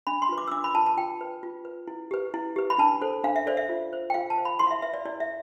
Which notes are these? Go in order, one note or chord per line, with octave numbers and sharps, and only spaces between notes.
D4 B5
C6
F4 B4
D6
E6
D4 D6
B5
F4 B4 A5
A5
F4 G5
B4
F4
B4
E4
G4 B4
E4
G4 B4
B5
D4 A5
A4 C5
D4 F5
E5
A4 C5 D5
E5
F4
C5
G5
F4 F5
A5
C5
B5
E4 C6
F5
E5
B4 E5
D5
E4 D5
E5